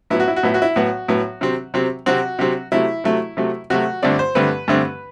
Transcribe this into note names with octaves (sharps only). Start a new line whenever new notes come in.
A2 F#3 B3 E4
F#4
E4
F#4
A2 F#3 B3 E4
F#4
E4
A2 F#3 B3 F#4
A2 F#3 B3
C3 F#3 C4
C3 F#3 C4
C3 F#3 C4 F#4
C3 F#3 C4
C3 F#3 A3 E4
C3 F#3 A3
C3 F#3 A3
C3 F#3 A3 F#4
G2 D3 A3 C4 D5
C5
G2 D3 A3 C4 B4
G2 D3 A3 C4